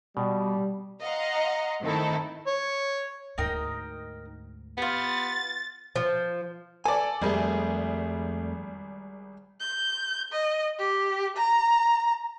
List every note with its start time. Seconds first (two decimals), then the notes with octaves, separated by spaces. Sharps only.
0.17 B2 G3
1.01 D#5 F5 F#5 A#5 C6
1.81 D#3 A3 C4 D#4 E4 A4
2.47 C#5
3.38 D2 G#2 D#4 A#4 G5
4.78 B3 F4 G4 A6
5.96 F3
6.86 A4 D5 G#5
7.22 G#1 F2 G3 A3 G#4
9.60 G6
10.32 D#5
10.79 G4
11.36 A#5